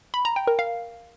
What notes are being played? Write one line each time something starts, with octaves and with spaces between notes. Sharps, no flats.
B5
A#5
G5
A#4
F5